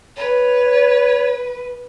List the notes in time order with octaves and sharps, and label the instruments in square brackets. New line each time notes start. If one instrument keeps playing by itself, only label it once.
[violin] B4 [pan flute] C#5